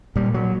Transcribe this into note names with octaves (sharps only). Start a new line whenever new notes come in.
A#2 G3
F#3